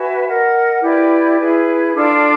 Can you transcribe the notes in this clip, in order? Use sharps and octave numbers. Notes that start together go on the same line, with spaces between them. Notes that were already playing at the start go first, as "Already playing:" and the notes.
Already playing: F#4 B4 E5 G#5
A#4 D#5 F#5
E4 G4 B4 D5
E4 G#4 B4
D4 F4 A4 D5